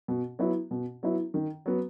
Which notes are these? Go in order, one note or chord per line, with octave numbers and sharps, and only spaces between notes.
B2
F#3 B3 E4
B2
F#3 B3 E4
D#3
F#3 B3